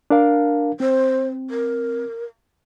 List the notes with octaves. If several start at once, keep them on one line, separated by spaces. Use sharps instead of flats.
D4 A#4 F5
C4 C5
A#4